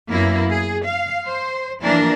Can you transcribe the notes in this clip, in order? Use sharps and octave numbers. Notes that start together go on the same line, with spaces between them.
F#2 A#3 B3 E4
G#4
F5
C5
E3 F3 A#3 D4 A#4